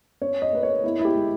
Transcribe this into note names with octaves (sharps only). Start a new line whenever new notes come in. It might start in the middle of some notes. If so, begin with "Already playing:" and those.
C#4 C#5
D#5
A#3 B4
C#5
B3 E4
E4
G4
G#3